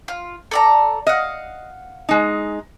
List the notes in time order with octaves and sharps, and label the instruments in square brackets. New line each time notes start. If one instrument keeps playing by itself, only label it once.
[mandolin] F4
A4 D5 A#5
[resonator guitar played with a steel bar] D#5 [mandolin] F5 F#5
[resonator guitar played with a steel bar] G#3 D#4